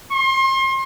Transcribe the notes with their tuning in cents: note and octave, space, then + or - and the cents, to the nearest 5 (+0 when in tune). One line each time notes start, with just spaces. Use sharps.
C6 +35